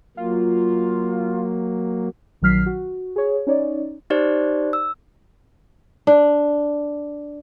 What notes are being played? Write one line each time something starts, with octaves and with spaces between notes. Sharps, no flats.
F#3 A#3 F4
A#1 D#3 F#3 F6 B6 C7
F#4
G#4 C#5
C#4 D#4 C#5 D5
D#4 G4 C5 D5
E6
D4